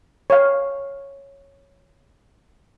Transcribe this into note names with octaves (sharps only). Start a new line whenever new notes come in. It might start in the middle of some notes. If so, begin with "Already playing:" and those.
C#5 F5